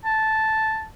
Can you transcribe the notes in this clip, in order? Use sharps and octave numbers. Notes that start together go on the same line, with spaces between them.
A5